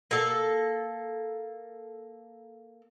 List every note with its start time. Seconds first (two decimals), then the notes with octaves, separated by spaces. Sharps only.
0.11 A#3 A4